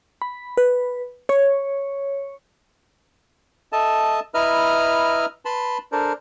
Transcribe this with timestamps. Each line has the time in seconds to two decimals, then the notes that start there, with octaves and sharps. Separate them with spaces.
0.22 B5
0.57 B4
1.29 C#5
3.72 A4 D#5 E5 A5
4.34 E4 B4 D#5 E5 A#5 F6
5.45 B4 A5 B5 C6
5.92 D4 A4 A#4 C5